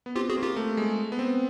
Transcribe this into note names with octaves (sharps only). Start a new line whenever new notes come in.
B3
C4 F4 G4
F#4 G#4
A#3
F4 G4
A3
G#3
B3
C4